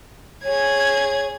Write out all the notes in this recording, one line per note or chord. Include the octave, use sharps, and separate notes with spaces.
G#4 C#5 G#6